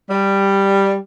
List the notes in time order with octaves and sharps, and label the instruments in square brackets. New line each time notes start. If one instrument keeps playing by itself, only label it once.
[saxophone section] G3